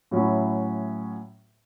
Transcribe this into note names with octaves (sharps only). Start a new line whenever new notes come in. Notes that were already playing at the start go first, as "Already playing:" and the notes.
A2 F#3 C#4 E4